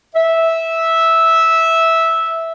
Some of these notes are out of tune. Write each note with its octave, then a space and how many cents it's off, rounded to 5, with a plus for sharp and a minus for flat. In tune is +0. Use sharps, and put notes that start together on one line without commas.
E5 -10